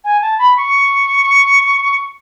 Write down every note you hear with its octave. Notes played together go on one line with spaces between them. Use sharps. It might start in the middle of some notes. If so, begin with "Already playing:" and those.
G#5
A5
B5
C#6